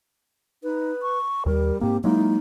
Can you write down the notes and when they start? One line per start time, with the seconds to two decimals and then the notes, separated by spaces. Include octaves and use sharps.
0.63 D#4 B4
1.02 C#6
1.46 D#2 G3 A#4
1.81 G#2 A#3 C4 G4
2.04 F#3 G#3 A#3 D#4 E4